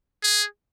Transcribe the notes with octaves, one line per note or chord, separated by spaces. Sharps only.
G#4